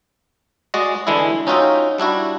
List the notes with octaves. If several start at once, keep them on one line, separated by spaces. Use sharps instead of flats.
G#3 F#4 D5 D#5
D3 E3 G#3 D4 E4
C#4 D#4 F4 F#4 E5 G5
G3 D4 E4 F#4